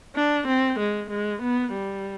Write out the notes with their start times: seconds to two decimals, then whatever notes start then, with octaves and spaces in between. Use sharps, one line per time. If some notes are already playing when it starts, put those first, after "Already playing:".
0.16 D4
0.48 C4
0.79 G#3
1.10 G#3
1.42 B3
1.73 G3